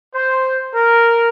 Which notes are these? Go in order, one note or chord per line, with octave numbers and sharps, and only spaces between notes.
C5
A#4